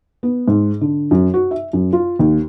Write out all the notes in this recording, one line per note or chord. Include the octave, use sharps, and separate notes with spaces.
B3
G#2
D3
F#2
F#4
E5
F#2
F4
D#2